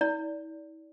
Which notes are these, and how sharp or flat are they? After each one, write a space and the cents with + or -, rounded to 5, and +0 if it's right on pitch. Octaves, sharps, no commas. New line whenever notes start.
E4 -45 D5 -20